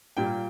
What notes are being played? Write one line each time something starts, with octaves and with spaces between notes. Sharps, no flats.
A#2 G3 A#3 G5